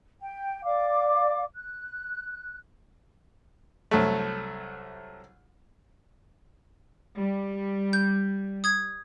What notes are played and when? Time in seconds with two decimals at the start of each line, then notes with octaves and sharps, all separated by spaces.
0.21 G5
0.65 D5 F5 D6
1.55 F#6
3.91 C2 F#3 A3
7.18 G3
7.93 G6
8.64 D#6 G#6